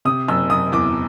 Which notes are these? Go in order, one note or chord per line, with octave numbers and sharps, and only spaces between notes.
C3 D#6
F#1 E6
F#1 D#6
E2 D6